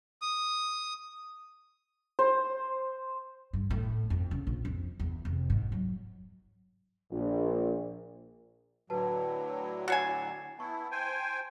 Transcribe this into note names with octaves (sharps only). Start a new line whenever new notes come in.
D#6
C5
G2
A2
F2
C#3
A#1
F2
E2
F1
G#2
F#3
A#1
A2 D3 F#3 F#4 B4 A5
F#4 C#5 G#5 A6 C7 E7
B3 E4 A5 C#6
C5 G5 G#5